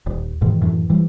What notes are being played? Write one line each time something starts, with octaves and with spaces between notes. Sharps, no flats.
D#1
G#2 B2 D#3 E3
F#2 A2 E3
E3 G3